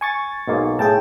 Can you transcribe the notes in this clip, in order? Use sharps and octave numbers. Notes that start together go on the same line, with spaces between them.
G#5 C#6 A6
B1 G#2 A#3
A2 G#4 G5 A5